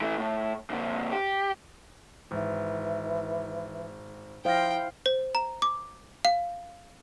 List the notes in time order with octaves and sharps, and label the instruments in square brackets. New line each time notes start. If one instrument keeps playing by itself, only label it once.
[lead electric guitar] E3 A3
A2
A#2 D3
G4
[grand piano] G#1 [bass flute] E3
[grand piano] F3 A#6 [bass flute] E4 [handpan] C5 F5 [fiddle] G5
[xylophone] C5
A#5
D6
F5